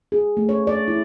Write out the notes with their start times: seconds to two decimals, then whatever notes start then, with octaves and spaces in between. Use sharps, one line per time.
0.12 G#4
0.37 A3
0.49 C#5
0.67 D5
0.88 E4